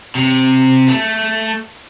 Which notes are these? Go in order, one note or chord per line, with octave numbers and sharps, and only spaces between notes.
C3
A3